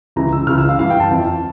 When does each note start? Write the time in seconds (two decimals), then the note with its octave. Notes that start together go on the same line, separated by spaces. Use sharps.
0.16 C#2 C#3 E3 A#5
0.32 E6
0.47 C#2 C#3 E3 F6
0.58 E6
0.69 F5
0.79 G2 E3 F5
0.90 G5
1.00 A5
1.11 F2 E3